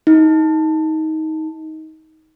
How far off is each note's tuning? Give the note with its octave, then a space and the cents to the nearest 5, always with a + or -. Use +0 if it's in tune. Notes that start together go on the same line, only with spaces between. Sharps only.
D#4 +20